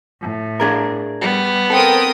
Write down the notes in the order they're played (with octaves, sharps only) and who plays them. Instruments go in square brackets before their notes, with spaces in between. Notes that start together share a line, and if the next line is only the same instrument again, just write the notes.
[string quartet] A2
[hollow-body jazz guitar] D4 G#4 A#4
[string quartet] G3 [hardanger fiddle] B3
[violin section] C4 D#6 [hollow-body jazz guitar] A4 [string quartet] A#4 G5